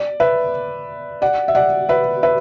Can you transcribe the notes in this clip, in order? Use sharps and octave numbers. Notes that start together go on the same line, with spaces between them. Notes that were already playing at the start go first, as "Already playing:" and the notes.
Already playing: D5
B4 E5
D5 F#5
E5
D5 F#5
B4 E5
B4 E5